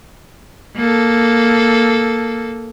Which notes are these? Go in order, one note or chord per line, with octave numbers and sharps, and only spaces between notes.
A#3 A4